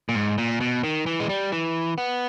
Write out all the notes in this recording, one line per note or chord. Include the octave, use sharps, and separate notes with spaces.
A#2
G#2
A#2
B2
D#3
E3
G#3
G3
E3
B3